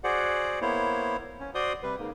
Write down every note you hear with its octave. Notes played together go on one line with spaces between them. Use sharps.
F#4 G#4 C5 D5 F#5
A#3 B3 E4 C5 C#5
C#4
F#4 C5 D5 C6 D#6
C3 G3 B4
G#2 C#3 A#3